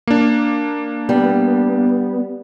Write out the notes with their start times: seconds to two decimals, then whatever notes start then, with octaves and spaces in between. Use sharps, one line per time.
0.07 A#3 D4
1.09 G3 B3